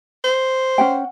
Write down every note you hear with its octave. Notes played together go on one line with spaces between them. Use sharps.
C5
C#4 F#5 G5